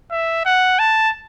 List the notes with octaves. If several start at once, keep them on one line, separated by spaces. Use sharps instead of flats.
E5
F#5
A5